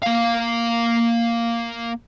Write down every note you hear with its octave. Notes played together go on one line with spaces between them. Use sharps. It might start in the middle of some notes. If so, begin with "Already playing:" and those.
A#3 F5